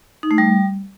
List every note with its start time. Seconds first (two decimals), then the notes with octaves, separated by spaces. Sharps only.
0.23 D#4
0.31 A3
0.38 G3